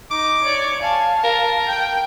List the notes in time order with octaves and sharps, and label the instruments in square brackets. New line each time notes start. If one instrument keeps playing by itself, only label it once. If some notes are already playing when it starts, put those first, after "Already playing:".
[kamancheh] D#4 [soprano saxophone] D6
[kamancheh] C#5 D5
[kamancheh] F5 A5 [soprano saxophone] G#5
[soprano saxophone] A#4
[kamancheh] G5